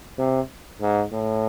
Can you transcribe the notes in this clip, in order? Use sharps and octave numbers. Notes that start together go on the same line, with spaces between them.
C3
G#2
A2